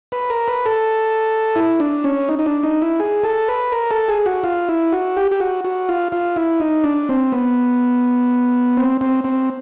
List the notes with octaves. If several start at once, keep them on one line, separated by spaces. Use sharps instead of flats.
B4
A#4
B4
A4
E4
D4
C#4
D#4
D#4
D4
D#4
E4
G#4
A4
B4
A#4
A4
G#4
F#4
F4
E4
F#4
G4
G4
F#4
F#4
F4
F4
E4
D#4
D4
C4
B3
C4
C4
C4